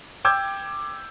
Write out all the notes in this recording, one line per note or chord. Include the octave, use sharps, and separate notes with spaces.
G5 D6 E6 G6 G#6